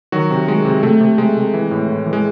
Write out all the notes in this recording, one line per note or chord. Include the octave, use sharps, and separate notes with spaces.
D#3 F#3 F#4
C3
D#3 G#3
C3
C3 A3
C3
C3 G#3
C3
E3
A2
A2
E3
G#3